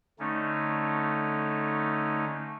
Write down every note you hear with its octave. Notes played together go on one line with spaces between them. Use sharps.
D3 A3 C#4 D#4